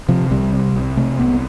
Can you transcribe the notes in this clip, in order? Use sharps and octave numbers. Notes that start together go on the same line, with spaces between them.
C3 F3
C2 G3
C3
C2
C3 A3
C2 B3